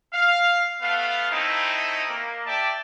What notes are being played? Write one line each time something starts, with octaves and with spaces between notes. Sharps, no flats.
F5
A3 B3 F5
A3 C4 D#4 E4
A#3
G4 D5 E5 G5 A5